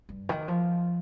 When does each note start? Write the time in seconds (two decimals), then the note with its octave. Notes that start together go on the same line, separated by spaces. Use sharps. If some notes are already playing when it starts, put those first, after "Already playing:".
0.09 G2
0.29 D#3
0.48 F3